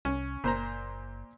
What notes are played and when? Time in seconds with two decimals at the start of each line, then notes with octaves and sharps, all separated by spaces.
0.05 C2 C#4
0.44 F#1 A#2 C5 A#5